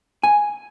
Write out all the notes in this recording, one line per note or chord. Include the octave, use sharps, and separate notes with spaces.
G#5